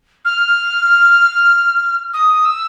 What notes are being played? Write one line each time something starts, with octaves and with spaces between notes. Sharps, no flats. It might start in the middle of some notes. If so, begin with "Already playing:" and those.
F6
D#6
E6